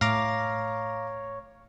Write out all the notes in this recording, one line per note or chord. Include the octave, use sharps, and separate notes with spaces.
A2 C#5 F5 A#5 D6